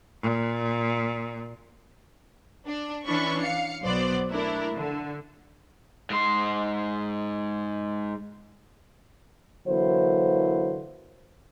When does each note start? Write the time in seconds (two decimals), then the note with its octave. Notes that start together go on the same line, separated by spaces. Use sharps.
0.21 A#2
2.67 D4
3.06 E3 C#4 D4 B5 C#6
3.41 F5 C#7
3.83 B1 F#3 B3 C5 D5
4.29 A3 D4 E4 A#4
4.75 D3
6.10 G#2 C6
9.67 D3 E3 F#3 A#3 E4 C5